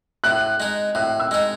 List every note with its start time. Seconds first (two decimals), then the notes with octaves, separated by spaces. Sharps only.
0.24 A2 F#6
0.60 G#3 D#4
0.95 A2 F#6
1.20 E6
1.31 G#3 D#4